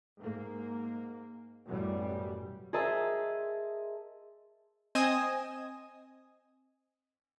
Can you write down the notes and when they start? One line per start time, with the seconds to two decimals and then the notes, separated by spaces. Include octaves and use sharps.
0.20 G#2 A#3
1.67 A1 F#2 B2 G3
2.73 G#4 A#4 C5 D#5 E5 A5
4.95 C4 D#5 G#5 D#6 E7